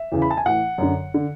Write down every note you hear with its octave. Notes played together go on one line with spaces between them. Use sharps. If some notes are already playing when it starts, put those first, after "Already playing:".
Already playing: E5
E2 C#3 E3
B5
A5
G#5
A2 E3 F#5
F#2 D3
D3